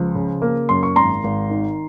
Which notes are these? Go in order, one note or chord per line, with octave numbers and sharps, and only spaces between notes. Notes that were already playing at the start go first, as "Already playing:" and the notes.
Already playing: C#2 F3
C#3
A#3
F#2 C6
C#6
G#1 A#5 C6
G#1
D#3